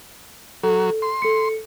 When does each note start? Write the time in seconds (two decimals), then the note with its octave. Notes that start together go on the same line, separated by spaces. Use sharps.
0.63 F#3 A4
1.02 C6
1.22 A4 C#7